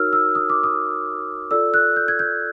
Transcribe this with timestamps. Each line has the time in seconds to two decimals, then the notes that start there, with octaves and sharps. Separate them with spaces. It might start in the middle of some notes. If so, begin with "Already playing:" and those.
Already playing: D#4 F#4 A#4 C#5 E6 F6
0.13 E6
0.35 D#6
0.50 D6
0.64 D#6
1.51 F4 A4 D5 E6
1.74 F#6
1.96 G6
2.08 G#6
2.19 G6